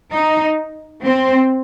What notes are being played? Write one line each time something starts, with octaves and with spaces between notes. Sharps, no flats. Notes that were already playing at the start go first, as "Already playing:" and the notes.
D#4
C4